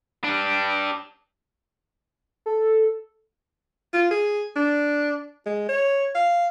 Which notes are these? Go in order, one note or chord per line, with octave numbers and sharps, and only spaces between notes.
D4 G4
A4
F4
G#4
D4
G#3
C#5
F5